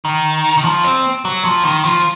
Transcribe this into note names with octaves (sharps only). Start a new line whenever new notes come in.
D#3
D#3
F3
C4
F#3
F3
D#3
F3